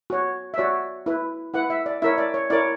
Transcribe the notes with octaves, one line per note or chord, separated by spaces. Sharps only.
F#4 C#5
E5
F#4 C#5 D5
E4 B4
E4 B4 F#5
E5
D5
E4 A#4 C#5 E5
D5
C#5
E4 A#4 C#5 D5